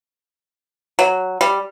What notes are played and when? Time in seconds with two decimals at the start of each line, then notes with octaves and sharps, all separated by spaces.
0.99 F#3
1.41 G3